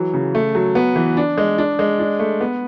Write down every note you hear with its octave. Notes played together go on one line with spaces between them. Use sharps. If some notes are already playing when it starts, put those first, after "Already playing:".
Already playing: E3 F#3
C#3
A3
F#3
B3
E3
D4
G#3
D4
G#3
D4
A3
B3